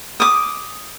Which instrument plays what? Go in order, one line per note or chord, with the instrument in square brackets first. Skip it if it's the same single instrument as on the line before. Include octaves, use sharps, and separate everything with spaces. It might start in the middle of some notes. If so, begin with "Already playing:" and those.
[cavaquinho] D6 D#6